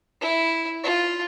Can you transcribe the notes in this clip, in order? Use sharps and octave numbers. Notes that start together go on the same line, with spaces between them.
E4
F4